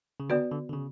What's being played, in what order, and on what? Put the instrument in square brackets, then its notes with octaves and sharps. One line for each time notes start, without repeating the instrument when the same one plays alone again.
[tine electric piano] C#3
[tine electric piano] D3 [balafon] B3 F#4 B4 D5
[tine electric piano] D3
D3
C#3